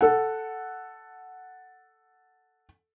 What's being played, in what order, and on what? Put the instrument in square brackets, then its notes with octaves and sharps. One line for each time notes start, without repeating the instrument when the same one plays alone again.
[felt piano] A4 F#5